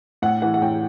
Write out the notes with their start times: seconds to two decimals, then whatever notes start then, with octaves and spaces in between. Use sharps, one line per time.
0.22 A2 F#5
0.42 E3 F#5
0.54 F#5
0.61 A2 G5